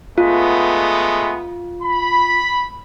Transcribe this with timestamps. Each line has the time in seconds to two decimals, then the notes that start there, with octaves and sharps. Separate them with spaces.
0.18 G#3 A3 B3 F4
1.83 B5